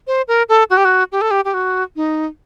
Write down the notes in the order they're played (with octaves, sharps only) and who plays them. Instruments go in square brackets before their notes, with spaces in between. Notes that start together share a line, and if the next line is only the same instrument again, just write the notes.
[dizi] C5
A#4
A4
F#4
G4
F#4
G4
A4
G4
G4
F#4
D#4